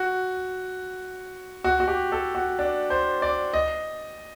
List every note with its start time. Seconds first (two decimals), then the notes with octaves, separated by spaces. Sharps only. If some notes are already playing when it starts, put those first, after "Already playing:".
Already playing: F#4
1.64 F#4
1.80 F#4
1.88 G4
2.12 A4
2.35 F#4
2.59 D4
2.90 C5
3.22 D5
3.54 D#5